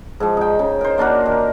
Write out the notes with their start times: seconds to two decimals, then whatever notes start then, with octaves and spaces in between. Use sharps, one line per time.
0.20 G#2 F3
0.37 D#4 G5
0.59 C#3
0.81 A#4 C5
0.98 A#3 D4 F#4 A#4
1.26 D#3